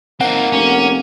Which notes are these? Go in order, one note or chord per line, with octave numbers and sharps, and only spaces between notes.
A#3 C4 D#4 F#5
F1 C#4